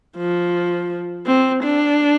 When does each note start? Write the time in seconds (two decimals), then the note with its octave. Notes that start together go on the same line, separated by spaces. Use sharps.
0.17 F3
1.26 C4
1.64 D4